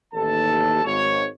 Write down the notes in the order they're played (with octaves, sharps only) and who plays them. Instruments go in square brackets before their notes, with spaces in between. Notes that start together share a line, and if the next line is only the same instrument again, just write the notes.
[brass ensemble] A1 D#2 A4 A5
G#1 G#2 C#5